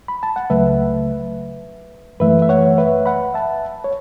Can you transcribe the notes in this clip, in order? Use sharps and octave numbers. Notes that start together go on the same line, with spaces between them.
B5
A5
F#5
C#2 C#3 F#3 A3 B4 E5
F#2 E3 A3 B4 E5
E5
C#5 F#5
B4 E5
F#5 B5
E5 A5
C#5